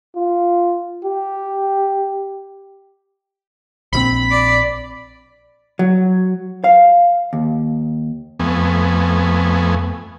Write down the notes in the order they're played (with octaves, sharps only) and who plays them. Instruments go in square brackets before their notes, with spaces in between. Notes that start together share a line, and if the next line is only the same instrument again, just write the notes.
[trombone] F4
G4
[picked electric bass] A#1 E3 C4 [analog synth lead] B5
[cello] D5
[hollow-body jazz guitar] F#3
F5
D#2
[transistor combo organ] F2 A3 B3 G#5